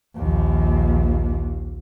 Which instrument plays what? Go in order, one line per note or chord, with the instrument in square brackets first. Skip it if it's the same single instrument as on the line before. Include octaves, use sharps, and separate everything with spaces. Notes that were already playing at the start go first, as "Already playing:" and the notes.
[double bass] A#1 D#2